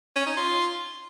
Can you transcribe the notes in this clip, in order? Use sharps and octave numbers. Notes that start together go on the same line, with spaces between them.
C#4
D#4
F4